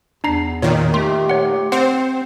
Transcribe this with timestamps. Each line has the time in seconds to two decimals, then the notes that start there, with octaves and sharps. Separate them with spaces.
0.24 E2 D4 A#5 C7
0.62 A#2 D#3 C#5
0.94 A3 G4 C6
1.30 C#5 F#5
1.72 C4 C5 F#5